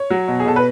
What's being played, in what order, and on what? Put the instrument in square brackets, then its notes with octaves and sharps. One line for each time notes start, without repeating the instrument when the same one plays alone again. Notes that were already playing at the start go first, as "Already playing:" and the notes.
Already playing: [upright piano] C#5
F#3
B2
G#4
B2 A4
B4